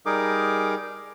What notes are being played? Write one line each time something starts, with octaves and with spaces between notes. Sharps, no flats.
G3 D#4 G#4 A#4 D6